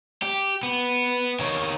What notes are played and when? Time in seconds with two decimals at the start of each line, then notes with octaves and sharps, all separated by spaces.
0.22 G4
0.63 B3
1.40 D#3 C#5